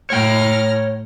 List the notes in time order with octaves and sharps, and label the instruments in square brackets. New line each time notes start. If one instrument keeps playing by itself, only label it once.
[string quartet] A2 A#5 F6 [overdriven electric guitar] C#5 G5